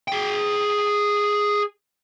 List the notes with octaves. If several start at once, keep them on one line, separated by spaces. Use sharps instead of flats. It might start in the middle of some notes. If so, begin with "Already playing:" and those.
G#4 G5